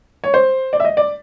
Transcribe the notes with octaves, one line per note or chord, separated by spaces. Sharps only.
C#5
C5
D5
E5
D#5
D5